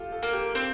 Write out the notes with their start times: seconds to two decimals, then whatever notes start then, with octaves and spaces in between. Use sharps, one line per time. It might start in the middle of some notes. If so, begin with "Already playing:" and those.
Already playing: F4 G4 A4
0.12 A4
0.23 A#3
0.33 G4
0.55 C4